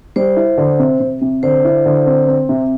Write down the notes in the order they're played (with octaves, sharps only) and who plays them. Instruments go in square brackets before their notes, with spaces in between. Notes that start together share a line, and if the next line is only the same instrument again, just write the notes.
[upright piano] G3 [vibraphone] C5
[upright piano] E4
D3
C3
C3
C3
[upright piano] D3 [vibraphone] C5
[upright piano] E4
D3
C4
C4
C3